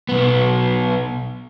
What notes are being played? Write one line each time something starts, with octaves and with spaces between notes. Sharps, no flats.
B1 B3